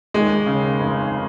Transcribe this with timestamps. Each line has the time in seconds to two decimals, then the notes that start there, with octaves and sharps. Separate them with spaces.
0.14 D#2 G#3
0.46 C#3
0.80 F1